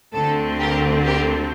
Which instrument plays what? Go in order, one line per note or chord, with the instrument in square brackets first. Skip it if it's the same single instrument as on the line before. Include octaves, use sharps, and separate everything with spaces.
[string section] D2 D3 A3 C4 A4
G4 A#4
G4 A#4